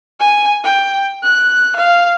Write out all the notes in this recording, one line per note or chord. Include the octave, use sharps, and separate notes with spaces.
G#5
G5
F#6
F5